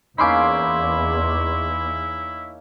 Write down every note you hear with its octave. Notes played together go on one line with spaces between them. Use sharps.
E2 A#3 C#4 D#4 E4 B5 C6 D6